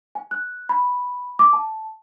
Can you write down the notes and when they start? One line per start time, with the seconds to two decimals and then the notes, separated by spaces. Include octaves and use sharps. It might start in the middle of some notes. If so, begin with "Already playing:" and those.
0.15 G#5
0.31 F#6
0.69 B5
1.39 D6
1.53 A5